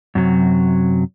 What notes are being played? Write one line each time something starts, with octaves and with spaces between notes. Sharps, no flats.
F#2 C3 F#3